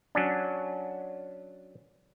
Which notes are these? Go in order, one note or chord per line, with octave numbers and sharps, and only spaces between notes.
F#3 C#4 D4